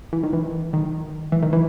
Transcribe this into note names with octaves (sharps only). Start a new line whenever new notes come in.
E3
D#3
E3
D#3
E3
D#3
E3